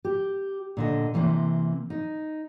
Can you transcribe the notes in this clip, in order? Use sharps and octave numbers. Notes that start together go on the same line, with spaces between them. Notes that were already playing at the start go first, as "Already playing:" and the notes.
G4
A#2 D3 D#5
C3 E3 A#3 C4
D#4